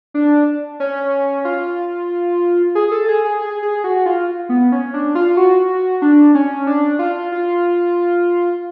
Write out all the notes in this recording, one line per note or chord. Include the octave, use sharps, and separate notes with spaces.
D4
C#4
F4
G#4
A4
G#4
G#4
G#4
G#4
F#4
F4
B3
C#4
D4
F4
F#4
D4
C#4
D4
F4
F4